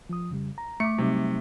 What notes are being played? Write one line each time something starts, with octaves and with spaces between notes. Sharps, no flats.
F3 D#6
F2 C#3 G3
A#5
A3 D6 C#7
C3 F#3 G3 D#4